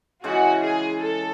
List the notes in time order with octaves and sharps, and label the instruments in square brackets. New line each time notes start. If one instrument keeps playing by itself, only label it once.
[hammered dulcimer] C#3 E3 G#3 [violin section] F#4
[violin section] G#4
A4